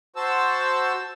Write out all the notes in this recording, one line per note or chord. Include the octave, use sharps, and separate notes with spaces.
F#4 C5 A5 E6